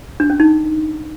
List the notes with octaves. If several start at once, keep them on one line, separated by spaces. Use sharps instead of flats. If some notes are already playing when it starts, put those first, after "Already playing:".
D4
C#4
D#4